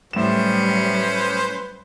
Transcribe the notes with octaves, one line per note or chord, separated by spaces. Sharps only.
A2 F#3 G3 C#4 B4 C5 E7